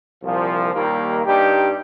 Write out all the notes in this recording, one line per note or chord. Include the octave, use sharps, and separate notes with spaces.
C2 A#2 F3
D#2 D#3 G3 A#3
G2 G3 D#4 G4